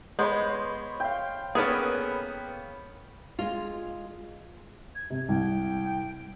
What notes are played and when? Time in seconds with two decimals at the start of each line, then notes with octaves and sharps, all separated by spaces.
0.19 G#3 B3 C5 C#5 B5
1.00 F5 G5
1.55 A#3 B3 C#4 G#4 A4 B4
3.39 G#3 F4
4.95 G#6
5.10 C3
5.29 C2 G5